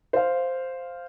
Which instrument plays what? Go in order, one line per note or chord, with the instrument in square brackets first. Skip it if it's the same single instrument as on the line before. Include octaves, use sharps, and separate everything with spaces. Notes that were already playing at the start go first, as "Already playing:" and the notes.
[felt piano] C5 F5